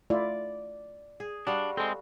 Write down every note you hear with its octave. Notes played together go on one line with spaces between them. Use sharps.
A3 E4 F4 D5
G#4
G3 D4 F#4 F5
G#3 C4 A4